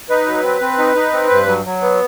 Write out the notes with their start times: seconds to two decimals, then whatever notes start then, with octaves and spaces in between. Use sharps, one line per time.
0.09 D#4 B4
0.27 F#3
0.44 C4
0.61 C4
0.78 D#4
0.95 D#4
1.13 C4
1.30 G2
1.47 F#3
1.65 F#3
1.81 B3